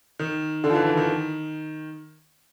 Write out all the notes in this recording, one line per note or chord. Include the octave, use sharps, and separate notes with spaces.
D#3
D3
F3
E3
E3
D#3